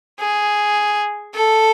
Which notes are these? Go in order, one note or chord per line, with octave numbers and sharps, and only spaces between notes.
G#4
A4